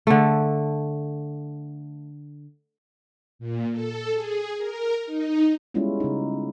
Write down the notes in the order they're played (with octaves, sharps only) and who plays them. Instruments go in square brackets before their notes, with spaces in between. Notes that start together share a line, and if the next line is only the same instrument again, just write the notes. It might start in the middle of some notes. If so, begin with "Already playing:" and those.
[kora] D3 A3
[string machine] A#2
A4
G#4
A#4
D#4
[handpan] G3 G#3 B3 C#4 E4 F4
C#3 D#4